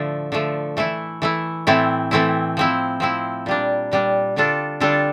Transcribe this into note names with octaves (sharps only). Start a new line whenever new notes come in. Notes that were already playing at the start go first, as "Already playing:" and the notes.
Already playing: A2 D3 F3 A3
D3 F3 A3
E3 A3 E4
E3 A3 E4
A2 E3 A3 C4 E4
A2 E3 A3 C4 E4
F3 C4 E4
F3 C4 E4
A#2 G3 D4
A#2 G3 D4
D3 G3 D4 F4 A4
D3 G3 D4 F4 A4